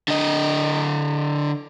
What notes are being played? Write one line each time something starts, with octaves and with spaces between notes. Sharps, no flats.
D3 D#5